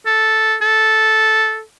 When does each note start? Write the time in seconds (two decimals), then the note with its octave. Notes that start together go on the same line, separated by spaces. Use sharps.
0.06 A4
0.62 A4